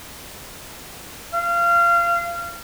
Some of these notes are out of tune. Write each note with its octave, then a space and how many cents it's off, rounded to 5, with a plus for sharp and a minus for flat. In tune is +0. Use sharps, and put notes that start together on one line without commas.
F5 -25